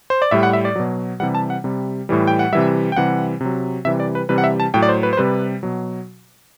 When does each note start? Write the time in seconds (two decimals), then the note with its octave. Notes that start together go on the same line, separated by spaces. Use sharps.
0.10 C5
0.22 D5
0.31 A2 G3 E5
0.43 F#5
0.53 E5
0.65 D5
0.76 B2 F#3
1.20 C3 E3 G3 F#5
1.35 A5
1.50 F#5
1.64 C3 G3
2.09 A2 E3 G3
2.27 G5
2.39 F#5
2.52 C3 E3 G3 E5
2.92 G5
2.96 C3 E3 G3 F#5
3.41 C3 F#3
3.85 C3 E3 G3 E5
4.00 D5
4.15 B4
4.29 C3 E3 G3 B4
4.38 F#5
4.44 E5
4.60 A5
4.74 A2 F#3 G5
4.83 D5
4.89 C5
5.03 B4
5.13 C5
5.17 C3 G3 B4
5.63 B2 F#3